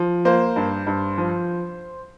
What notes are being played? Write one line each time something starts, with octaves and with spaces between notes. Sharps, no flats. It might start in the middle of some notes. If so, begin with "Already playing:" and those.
Already playing: F3
A#3 C5
G2
G2
F3